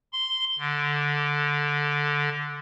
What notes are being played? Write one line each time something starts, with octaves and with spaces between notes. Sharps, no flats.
C6
D3